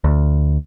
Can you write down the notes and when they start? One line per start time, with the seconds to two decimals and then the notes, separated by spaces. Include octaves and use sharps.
0.04 D2